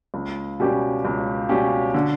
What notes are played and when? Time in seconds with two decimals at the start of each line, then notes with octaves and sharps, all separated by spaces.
0.14 C#2
0.60 B2 G3 C#4 G4
1.05 C#2
1.49 B2 G3 C#4 G4
1.94 D3